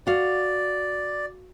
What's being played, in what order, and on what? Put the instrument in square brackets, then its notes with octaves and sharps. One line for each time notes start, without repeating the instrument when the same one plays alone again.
[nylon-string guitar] F#4 F5 [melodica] D5